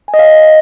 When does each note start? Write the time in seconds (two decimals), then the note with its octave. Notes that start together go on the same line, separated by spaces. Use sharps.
0.08 G#5
0.14 D#5
0.19 F5
0.25 D#5